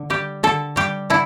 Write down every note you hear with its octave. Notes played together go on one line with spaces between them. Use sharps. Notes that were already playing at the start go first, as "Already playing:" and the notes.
Already playing: D3
G3 G4
D3 A4
G3 G4
D3 E4